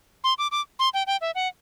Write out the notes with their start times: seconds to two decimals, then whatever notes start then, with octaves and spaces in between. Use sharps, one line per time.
0.24 C6
0.38 D6
0.51 D6
0.79 C6
0.94 G5
1.07 G5
1.21 E5
1.35 F#5